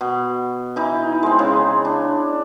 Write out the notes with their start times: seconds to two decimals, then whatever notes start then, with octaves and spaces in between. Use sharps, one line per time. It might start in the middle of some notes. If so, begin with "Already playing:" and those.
0.01 B2
0.76 E3 D#4 E4
1.23 G#3 C4
1.39 C#3
1.85 D4